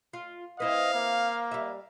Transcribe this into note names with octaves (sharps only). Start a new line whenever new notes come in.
F4
C4 E4 B4 D#5 F5
A#3
G3 E5